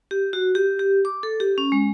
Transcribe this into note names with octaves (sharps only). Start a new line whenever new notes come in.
G4
F#4
G4
G4
D6
A4
G4
C#4
G#3